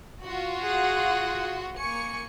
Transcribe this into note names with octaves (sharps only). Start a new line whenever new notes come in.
F4 F#4
G#4 F#5
A#3 G#5 C#6 C#7